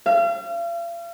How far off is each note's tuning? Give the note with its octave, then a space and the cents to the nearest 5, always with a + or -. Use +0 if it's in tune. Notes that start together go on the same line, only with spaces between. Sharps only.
F5 -40